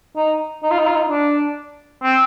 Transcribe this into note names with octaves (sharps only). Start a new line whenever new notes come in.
D#4
D#4
F4
D#4
F4
D#4
D4
C4